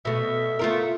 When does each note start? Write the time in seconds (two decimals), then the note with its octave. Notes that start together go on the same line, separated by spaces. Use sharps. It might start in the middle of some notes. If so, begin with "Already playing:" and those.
0.05 B2 A3 E5
0.59 A3 F4 A#4